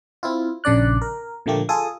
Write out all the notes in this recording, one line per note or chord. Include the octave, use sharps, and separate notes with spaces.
C4 E4 F4
A#1 C#3 D4 D5 F#6
A#4
A#2 D3 F3 A3 A#3 G4
F4 G#4 A4 D#6